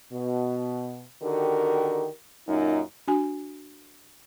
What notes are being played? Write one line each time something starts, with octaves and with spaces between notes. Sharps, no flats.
B2
D3 D#3 F#4 G4 A#4
F#2 A#2 D#4
D4 F#4 G#5